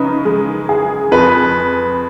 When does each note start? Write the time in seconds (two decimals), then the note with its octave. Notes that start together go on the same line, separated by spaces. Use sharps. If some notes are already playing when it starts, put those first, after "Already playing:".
Already playing: C#3 D#4 B4
0.25 G#3
0.69 G#4
1.11 F2 B4